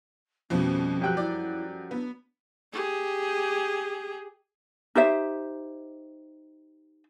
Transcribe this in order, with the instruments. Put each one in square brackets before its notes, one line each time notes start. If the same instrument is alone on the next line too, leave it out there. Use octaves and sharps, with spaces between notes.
[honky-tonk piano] F2 B2 [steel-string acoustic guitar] F3 G3 A3 [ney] C#4
[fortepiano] F#2 G5 F#6 [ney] G4
[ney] E4 [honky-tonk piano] D5
[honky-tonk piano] B3 [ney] D4
[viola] G4 G#4
[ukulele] D#4 G4 C5 E5